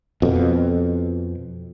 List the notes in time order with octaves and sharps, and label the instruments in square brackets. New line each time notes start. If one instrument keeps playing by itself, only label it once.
[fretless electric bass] F2 B2